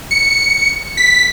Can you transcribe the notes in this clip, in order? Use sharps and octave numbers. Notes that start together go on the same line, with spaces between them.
C#7
B6